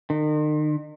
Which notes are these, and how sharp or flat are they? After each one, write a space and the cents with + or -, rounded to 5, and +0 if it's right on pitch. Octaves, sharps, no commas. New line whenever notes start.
D#3 -40